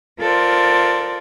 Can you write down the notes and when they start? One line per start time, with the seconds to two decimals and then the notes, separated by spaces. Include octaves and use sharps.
0.19 F4 A4 A#4 C5 D5